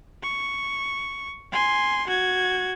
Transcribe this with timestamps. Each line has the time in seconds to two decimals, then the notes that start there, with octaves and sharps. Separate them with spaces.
0.23 C#6
1.52 G#5 C6
2.07 F#4 G#6